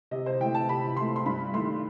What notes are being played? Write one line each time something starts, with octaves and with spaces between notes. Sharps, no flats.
C3 D#5
C5
E3 A3 G5
A5
C3 B5
E3 A3 C6
C6
G2 B5
D#3 A3 C6